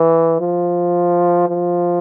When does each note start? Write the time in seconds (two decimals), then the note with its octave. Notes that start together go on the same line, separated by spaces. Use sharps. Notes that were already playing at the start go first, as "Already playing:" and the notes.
Already playing: E3
0.40 F3
1.48 F3